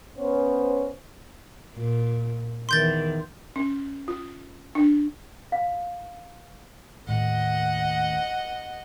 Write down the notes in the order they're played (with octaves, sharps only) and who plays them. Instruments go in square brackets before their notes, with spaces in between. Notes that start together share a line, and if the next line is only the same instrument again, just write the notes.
[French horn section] B3 C#4 C5
[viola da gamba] A#2
[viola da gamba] E2 D#3 [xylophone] C6 G6 A6
[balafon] C#4
F4
D4
[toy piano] F5
[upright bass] D#2 A2 [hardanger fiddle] D#5 F#5